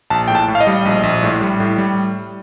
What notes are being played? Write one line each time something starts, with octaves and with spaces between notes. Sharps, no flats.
A#1 A5
A2 G5
A5
A2
F5
D#5
G3
A#1
A#1
A2
G3
A2
G3